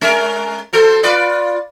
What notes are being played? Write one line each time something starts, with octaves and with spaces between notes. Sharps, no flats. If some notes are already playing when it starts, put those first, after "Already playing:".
G#3 C#4 A#4
F#3 A4 C5
F4 B4 D5